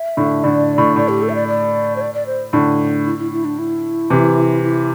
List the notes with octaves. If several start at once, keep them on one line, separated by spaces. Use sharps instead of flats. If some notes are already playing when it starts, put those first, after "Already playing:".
Already playing: E5
A2 D3
A2 D3 D5
A2
A2 D5
G4
A4
E5
D5
D5
C5
D5
D5
C5
A2 D3
E4
E4
E4
D4
E4
C3 E3
E4